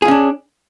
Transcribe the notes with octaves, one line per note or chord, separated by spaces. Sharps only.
C#4 D4 F4 G#4